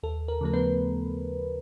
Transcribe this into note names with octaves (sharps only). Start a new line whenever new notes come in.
D#2 A4
A#4
C#3 F3 A3 A#4
B3 B4